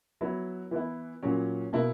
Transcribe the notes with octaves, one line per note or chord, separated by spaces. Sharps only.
F#3 B3 E4
E3 B3 E4
A#2 F#3 C#4
B2 A#3 E4